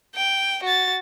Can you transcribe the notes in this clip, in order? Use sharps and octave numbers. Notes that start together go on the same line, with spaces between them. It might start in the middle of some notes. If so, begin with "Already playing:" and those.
G5
F#4 A6